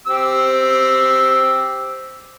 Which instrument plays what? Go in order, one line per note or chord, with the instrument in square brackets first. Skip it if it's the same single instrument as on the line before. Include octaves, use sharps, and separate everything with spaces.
[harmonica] C4 G4 E6